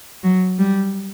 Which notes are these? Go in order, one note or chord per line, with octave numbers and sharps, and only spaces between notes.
F#3
G3